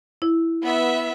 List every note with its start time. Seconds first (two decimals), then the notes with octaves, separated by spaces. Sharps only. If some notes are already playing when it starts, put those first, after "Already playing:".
0.22 E4
0.61 B3 E5